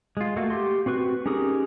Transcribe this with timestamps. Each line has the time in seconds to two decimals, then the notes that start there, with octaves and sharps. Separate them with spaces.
0.17 G#3 F4
0.36 A3 A#3 F#4
0.50 G4 C6
0.86 C4 F#4 B4 C#6 F#6
1.26 C#4 D#4 G4 G#4 A#4